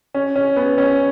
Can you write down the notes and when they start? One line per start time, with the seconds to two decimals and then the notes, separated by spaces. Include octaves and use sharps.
0.14 C#4
0.36 C#4
0.56 B3
0.78 C#4